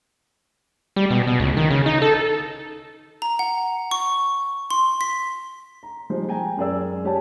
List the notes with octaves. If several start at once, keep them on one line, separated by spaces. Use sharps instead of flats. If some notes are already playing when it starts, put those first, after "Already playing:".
G3
B2
B2
C#2
D#3
C#3
D#4
A4
A#5
F#5
C#6
C6
B6
A#5
F3 G3 G#3 D#4 C5
G5 G#5 A#5
F#2 G#3 G#4 A#4 D5 E6
G#3 C#4 G4 C#5 G#5 A5